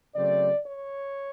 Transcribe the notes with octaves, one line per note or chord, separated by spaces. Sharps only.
C#3 F#3 A3 C4 D5
C#5